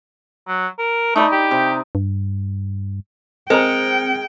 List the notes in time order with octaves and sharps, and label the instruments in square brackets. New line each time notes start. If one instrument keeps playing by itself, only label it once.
[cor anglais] F#3
A#4
[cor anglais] A3 [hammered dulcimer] D#4 D5 B5
[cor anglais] G4
[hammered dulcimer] C3
[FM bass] G2
[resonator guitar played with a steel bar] G#3 [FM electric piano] C4 C#7 [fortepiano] A#4 A#5 [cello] G5